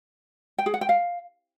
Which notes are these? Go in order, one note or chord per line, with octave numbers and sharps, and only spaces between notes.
G5
G#4
F#5
G5
F5